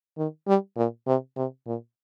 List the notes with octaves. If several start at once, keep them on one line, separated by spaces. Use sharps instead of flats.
D#3
G3
A#2
C3
C3
A#2